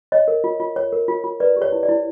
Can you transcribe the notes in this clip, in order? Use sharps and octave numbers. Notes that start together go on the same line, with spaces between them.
C#5 D#5
A#4
F4
F4
C#5
A#4
F4
F4
B4 D5
G4
C#5
E4
D5
E4